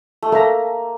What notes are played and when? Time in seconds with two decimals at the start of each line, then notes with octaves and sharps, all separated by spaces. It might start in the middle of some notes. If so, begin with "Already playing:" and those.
0.22 A3
0.32 A#3 A4 E5 A#5